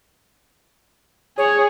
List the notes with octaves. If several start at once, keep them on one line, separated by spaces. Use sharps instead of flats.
G#4 C#5